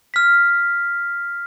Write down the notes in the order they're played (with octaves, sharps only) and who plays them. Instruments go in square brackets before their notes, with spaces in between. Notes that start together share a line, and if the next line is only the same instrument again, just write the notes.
[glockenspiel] F6 B6